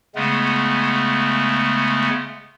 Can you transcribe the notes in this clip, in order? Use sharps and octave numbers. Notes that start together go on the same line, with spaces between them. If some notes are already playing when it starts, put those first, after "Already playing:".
C#3 G#3 A3 B3